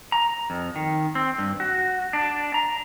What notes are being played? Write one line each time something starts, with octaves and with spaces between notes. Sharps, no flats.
A#5
F2
D#3
C4
G2
F#4
D4
A#5